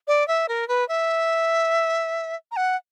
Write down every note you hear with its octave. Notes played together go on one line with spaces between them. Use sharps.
D5
E5
A#4
B4
E5
A#5
F#5